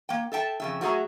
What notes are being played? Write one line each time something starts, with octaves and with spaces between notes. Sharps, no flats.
A#3 G5
A4 E5 G5 A5
F2 C#3 E5
F#3 A3 F#4 G#4 E5 A#5